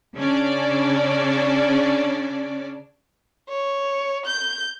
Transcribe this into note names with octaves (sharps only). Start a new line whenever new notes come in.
C#3 C#4 D4 D5
C#5
G6